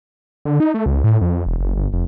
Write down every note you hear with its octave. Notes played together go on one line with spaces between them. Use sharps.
D3
D#4
A3
C#2
A2
F2
E1
F#1
G1
F1